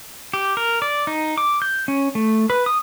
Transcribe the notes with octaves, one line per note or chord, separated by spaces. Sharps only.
G4
A#4
D5
D#4
D6
G6
C#4
A3
B4
D#6